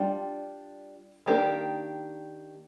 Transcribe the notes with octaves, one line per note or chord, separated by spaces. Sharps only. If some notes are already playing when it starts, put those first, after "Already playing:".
Already playing: G3 D4 F4
D#3 A#3 D4 G4 A#4